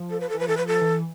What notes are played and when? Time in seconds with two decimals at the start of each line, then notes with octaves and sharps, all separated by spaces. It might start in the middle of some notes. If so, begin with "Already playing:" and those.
Already playing: F3
0.11 A4
0.20 B4
0.29 A4
0.34 E3
0.39 F3 B4
0.48 E3 A4
0.57 F3 B4
0.67 A4
0.81 E3